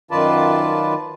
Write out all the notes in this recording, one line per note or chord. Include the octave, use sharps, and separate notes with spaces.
F#2 D#3 F4 B4 D5 A5